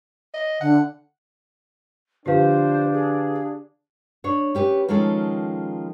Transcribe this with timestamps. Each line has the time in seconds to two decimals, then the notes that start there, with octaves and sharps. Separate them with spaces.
0.34 D#5
0.61 D3 F#5
2.26 D3 F3 D4 G4 B4 C5 F5
2.93 G#4
4.24 D4 C#5
4.55 C#4 G4 B4
4.88 D#3 F3 G#3 C#4 A4